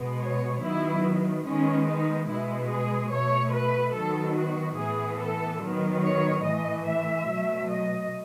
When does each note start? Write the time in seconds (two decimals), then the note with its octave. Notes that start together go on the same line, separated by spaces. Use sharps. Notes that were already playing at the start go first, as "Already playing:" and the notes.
Already playing: B2 G#3 B3
0.20 C#5
0.62 D#3 F#3 B3 E4
1.45 D#3 G#3 B3 C#4
1.86 D#4
2.28 B2 G#3 B3 E4
2.70 G#4
3.11 B2 A3 C#5
3.53 B4
3.94 D#3 F#3 B3 A4
4.36 F#4
4.77 A2 E3 B3 G#4
5.19 A4
5.60 D#3 F#3 B3
6.01 C#5
6.43 A2 E3 A3 D#5
6.85 E5
7.27 B2 F#3 A3
7.68 D#5